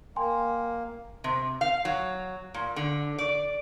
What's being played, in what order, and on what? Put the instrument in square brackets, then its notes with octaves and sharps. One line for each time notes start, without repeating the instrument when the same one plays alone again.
[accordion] A#3 [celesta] G5 G#5 C6
[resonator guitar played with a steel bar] C3
F5
F#3
A#2
D3
D5